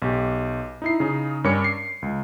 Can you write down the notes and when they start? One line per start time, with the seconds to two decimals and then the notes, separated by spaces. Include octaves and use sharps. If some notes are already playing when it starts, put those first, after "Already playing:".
0.02 B1 G4
0.82 D#4 E4 C7
1.00 C#3 D#4
1.44 G2 C#4 A#4 C#5 D6 C#7
1.64 C7
2.02 C#2